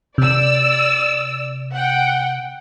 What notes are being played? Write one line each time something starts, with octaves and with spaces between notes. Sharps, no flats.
C3 D5 E6
F#5 G5